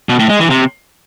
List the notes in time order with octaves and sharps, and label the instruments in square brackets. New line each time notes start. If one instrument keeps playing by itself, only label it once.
[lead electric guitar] B2
A2
G#3
E3
C3